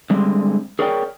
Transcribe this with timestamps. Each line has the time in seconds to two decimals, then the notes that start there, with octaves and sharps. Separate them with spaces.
0.10 D3 G3 G#3 C4
0.79 G#4 A#4 C#5 D5 F#5 G5